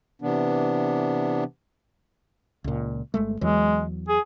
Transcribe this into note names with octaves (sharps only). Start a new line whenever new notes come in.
C3 E3 B3 D4
C#2 A#2
G1 G#3 A3
E2 E3 F#3 G#3
G#4